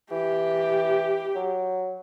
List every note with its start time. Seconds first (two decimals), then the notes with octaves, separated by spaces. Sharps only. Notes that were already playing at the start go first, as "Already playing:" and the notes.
0.12 E3 G4
1.36 F#3